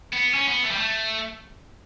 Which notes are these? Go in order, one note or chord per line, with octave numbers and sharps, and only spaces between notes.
B3
C#4
B3
A3
G3
A3